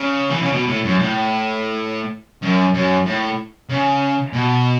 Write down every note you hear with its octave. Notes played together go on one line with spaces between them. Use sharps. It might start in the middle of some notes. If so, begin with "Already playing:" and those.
Already playing: C#3
E3
C#3
B2
A2
F#2
A2
F#2
F#2
A2
C#3
B2